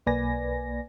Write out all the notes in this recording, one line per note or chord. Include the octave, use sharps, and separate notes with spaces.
B1 A#3 B4 D5 G#5 A#6